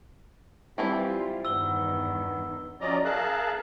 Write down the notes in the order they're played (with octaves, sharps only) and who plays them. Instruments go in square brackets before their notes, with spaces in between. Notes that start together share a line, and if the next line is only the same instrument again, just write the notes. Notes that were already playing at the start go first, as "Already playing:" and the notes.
[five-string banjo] E3 C4 E4 [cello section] G3 F4 [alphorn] G4
[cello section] E2 G2 D#3 [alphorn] B3 [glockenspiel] E6 G7
[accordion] F3 F#3 C#4 D5 D#5 A#5
G#4 A#4 E5 F5 A5 F#6